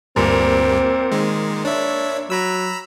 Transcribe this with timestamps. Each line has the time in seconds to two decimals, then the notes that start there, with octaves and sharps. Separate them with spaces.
0.16 D2 G2 A#2 G3 C4
1.12 D#3 G#3
1.65 D4 C#5 E5
2.30 F#3 A#5 B5 E6